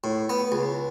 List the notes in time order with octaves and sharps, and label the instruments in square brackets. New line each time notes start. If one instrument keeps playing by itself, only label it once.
[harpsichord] A2
B3
C#2